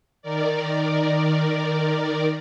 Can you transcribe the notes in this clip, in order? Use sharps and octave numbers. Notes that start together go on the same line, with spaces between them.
D#3 A#4 D5